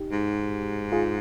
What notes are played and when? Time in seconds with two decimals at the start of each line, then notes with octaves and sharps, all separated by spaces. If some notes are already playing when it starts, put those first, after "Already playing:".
Already playing: D#4 G4
0.12 G#2
0.92 F4 G#4